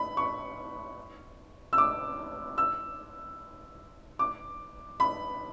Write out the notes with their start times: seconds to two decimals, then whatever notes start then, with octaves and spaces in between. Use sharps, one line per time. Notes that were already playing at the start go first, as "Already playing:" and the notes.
Already playing: B5
0.17 C#6
1.73 E6
1.78 D6
2.58 E6
4.19 D6
5.00 B5